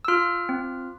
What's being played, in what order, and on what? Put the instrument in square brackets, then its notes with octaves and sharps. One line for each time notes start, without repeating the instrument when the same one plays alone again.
[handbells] E6
F4 F6
C4